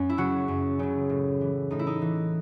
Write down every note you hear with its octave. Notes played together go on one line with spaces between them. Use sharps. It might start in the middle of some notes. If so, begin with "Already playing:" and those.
Already playing: F#2 C#4
E4
C#3 F#3 F#4
F#2
C#3 F#3
A2
E3
A2 D#4
E4
D#4
E3